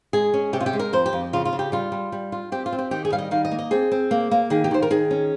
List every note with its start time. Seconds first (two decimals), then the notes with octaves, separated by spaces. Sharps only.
0.13 G#3 G#4
0.34 C#4
0.53 C3 G4
0.60 F4
0.66 G4
0.73 G#3
0.79 A#4
0.93 F2 C5
1.06 G4
1.13 F2
1.33 C#3 F4
1.45 F4
1.53 C#3
1.59 G4
1.72 G3 F4
1.92 G3
2.12 G3
2.32 F4
2.52 C4 G4
2.66 F4
2.72 C4
2.79 G4
2.91 D#3 G4
3.05 G#4
3.12 G3 F5
3.19 D#5
3.31 D#3 F5
3.45 D#5
3.51 A#3
3.59 D#5
3.71 C4 G#4
3.91 C4
4.11 A#3
4.31 A#3
4.50 D#3 G#4
4.64 G4
4.71 D#3 C5
4.82 A#4
4.90 D#3 G#4
5.11 C#4